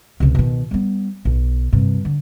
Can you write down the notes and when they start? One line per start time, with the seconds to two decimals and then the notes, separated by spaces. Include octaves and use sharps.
0.20 C#2 C3
0.35 B2 D#3
0.71 G3 B3
1.25 B1
1.73 G2 C3
2.05 D3